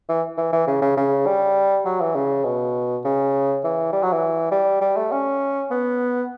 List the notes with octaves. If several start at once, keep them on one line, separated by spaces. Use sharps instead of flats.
E3
E3
E3
C#3
C#3
C#3
G3
F#3
E3
C#3
B2
C#3
E3
G3
F#3
E3
G3
G3
A3
C#4
B3